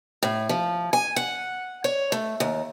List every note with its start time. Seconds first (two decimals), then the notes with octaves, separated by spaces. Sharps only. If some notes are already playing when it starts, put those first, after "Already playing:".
0.23 A2
0.49 F3
0.93 G#5
1.16 F#5
1.84 C#5
2.12 A3
2.40 D#2